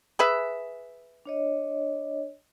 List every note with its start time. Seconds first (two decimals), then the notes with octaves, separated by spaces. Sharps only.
0.19 G#4 B4 E5
1.26 D4 C#5 D#5